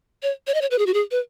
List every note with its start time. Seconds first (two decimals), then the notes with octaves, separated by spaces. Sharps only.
0.23 C#5
0.47 C#5
0.54 D#5
0.61 C#5
0.71 B4
0.78 G#4
0.86 F#4
0.94 G#4
1.11 B4